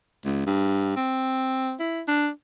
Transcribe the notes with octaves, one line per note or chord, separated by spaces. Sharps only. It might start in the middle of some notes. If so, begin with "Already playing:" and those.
C#2
G2
C4
E4
D4